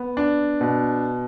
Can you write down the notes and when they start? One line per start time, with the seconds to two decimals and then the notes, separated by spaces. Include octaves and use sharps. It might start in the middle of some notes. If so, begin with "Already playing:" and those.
Already playing: B3
0.17 D4
0.61 B2